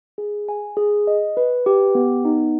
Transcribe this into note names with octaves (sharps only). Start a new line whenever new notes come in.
G#4
G#5
G#4
D#5
B4
G4
B3
D#4